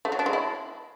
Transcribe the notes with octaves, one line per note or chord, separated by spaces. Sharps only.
A3
F#3
D4
G#3
E4